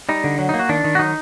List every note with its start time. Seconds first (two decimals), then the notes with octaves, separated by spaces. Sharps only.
0.09 G3 D#4
0.24 D3
0.39 F#3
0.49 D#4
0.54 A#3
0.59 F#4
0.69 D#3 D4
0.84 D#3
0.95 F#4
0.99 F#3 D#4